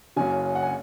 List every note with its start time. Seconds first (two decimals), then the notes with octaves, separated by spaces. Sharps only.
0.16 F#1 F#2 C#3 G#5
0.55 F#5
0.63 G#5